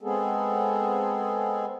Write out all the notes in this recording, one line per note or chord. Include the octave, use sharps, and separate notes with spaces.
G#3 B3 C4 G#4 A4